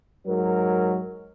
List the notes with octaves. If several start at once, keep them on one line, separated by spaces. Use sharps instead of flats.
G#2 F#3 A#4